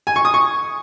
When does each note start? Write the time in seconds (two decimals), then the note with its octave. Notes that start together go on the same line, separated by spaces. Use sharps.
0.07 G#5
0.16 C#6
0.25 D#6
0.34 C#6